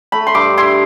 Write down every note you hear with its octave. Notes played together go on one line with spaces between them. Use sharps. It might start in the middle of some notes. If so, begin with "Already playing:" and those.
A3 B5
C6
G2 D6
E4 C6